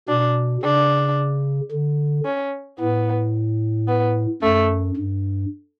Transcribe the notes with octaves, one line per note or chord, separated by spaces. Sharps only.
B2 D4
C#3 D4
D3
C#4
A2 B3
B3
F#2 A3
G2